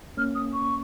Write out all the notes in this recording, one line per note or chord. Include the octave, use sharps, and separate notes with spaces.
A#3 C#4 F6
D#6
C#6